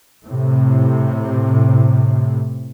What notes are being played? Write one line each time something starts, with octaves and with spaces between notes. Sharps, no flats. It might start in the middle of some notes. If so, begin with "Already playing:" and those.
A2 C3